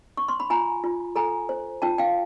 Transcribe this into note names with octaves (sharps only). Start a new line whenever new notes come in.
C#6
C6
B5
F4 G#5 A#5
F4
A4 G#5 A#5
C5
F4 G5 A5
F5 G5